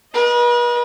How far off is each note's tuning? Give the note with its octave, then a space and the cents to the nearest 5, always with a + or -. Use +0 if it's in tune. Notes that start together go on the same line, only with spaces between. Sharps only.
B4 -40 D#5 +0